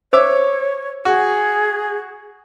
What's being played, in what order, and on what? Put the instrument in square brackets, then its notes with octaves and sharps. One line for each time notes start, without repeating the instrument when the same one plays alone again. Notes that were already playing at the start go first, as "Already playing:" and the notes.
[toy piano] C5 [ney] C#5 [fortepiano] E5 D6 E6
[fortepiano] F#4 [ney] G#4